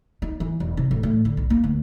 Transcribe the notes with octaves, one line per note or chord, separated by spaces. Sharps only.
D#4
E3
E1
C3
A1
A2
D3
B1
A#3
D2